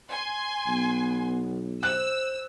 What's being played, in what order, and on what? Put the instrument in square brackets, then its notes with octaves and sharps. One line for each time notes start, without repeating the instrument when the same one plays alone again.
[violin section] G#5 C6
[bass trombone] B1 [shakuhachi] B3
[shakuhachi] C5 [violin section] E6 [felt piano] F#6